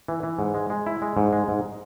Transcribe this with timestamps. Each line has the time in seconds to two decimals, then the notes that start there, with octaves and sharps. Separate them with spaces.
0.08 E3
0.23 E3
0.39 G#2
0.54 G#3
0.70 G#3
0.86 E4
1.02 G#3
1.17 G#2
1.33 G#3
1.48 G#2